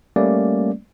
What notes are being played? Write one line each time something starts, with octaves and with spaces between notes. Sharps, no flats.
G3 A3 A#3 C#4 D5